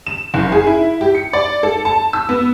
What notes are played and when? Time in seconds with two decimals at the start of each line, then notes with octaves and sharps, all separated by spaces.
0.07 E7
0.34 F#1
0.52 G#4
0.67 E4
1.01 G4
1.15 C#7
1.33 D5
1.63 A4
1.85 A5
2.13 E6
2.29 B3